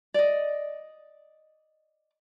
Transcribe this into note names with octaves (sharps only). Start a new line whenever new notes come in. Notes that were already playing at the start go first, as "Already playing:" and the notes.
D5 D#5